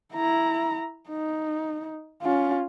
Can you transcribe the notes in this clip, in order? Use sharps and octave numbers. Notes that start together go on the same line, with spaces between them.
E4 A#5
D#4
C#4 F4